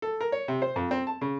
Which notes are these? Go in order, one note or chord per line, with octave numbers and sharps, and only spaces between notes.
A4
A#4
C#5
C3
C5
F2
C4
A5
C#3